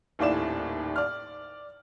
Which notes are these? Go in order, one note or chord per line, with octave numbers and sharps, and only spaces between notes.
D#1 D#2 A2 D5 E7
D5 F6